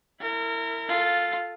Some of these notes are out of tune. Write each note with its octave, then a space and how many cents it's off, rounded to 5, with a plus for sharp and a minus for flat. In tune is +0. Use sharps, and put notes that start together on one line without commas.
E4 +5 A#4 -30
F4 +0 A4 +0